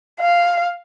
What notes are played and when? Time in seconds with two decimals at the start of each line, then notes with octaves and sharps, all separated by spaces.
0.20 F5